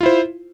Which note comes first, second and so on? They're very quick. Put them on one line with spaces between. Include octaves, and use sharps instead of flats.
F4 E4 C5